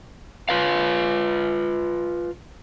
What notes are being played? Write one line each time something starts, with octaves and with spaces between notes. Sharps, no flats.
F4 B4 F5